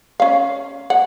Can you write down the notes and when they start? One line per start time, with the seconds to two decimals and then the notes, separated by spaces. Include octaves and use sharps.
0.20 C#4 F5
0.90 F#5